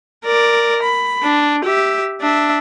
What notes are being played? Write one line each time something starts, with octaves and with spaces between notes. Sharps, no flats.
A#4 D5
B5
D4
G4 E5
D4 E5